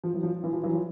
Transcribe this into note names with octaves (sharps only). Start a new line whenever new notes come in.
F3
E3 F#3
F3
E3
F3
E3 F#3
F3